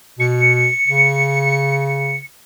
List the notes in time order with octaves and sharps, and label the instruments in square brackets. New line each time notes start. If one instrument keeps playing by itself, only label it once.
[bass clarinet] B2 [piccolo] C#7
[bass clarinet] C#3